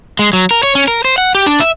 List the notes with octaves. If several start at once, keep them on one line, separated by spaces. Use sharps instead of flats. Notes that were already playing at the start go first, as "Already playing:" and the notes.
G#3
F#3
A#4
C#5
C#4
A#4
C5
F#5
G4
D4
E5